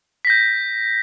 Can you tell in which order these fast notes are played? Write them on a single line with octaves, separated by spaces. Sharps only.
B6 A#6 G6